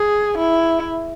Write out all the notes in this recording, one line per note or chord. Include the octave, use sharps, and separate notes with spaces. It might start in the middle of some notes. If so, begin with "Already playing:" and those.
Already playing: G#4
E4